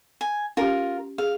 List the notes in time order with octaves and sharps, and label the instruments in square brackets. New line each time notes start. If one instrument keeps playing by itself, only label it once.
[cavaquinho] G#5
[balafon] C#4 G4 [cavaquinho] F4 A#4
[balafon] G#4 [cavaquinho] F5